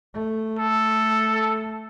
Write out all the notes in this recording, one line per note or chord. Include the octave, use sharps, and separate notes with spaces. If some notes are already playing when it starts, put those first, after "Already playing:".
A3
A4